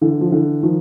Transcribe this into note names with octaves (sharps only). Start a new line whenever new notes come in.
D3 E3
F3
D3 E3
D#3 F3